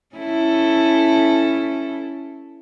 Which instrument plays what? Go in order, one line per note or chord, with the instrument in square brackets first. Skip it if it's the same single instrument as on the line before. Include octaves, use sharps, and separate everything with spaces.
[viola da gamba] C#4 E4 A4